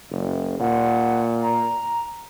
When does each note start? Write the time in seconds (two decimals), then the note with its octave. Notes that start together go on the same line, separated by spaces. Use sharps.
0.10 F#1
0.60 A#2 F#5
1.42 A#5